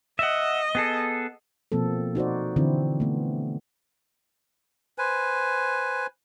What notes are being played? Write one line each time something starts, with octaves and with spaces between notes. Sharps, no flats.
D#5 E5 F#5
B3 G#4 A4
B2 F3 A#3 C4 A4
D#4 F#4 C5 D5
D3 E3 C4 E4 F#4
A3 B3
B4 C5 G#5